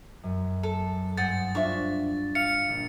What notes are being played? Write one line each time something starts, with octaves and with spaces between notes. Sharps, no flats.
F#2
A4
G2 C5 F#5 G#5 D#6 A6
D4 F4 C5 E5 C#6
F5 C#7
A#1